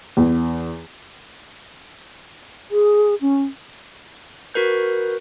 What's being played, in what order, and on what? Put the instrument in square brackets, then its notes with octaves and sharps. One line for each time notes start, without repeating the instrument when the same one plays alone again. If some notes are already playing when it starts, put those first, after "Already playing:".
[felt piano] E2
[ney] G#4
C#4
[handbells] F#4 A#4 B4 G6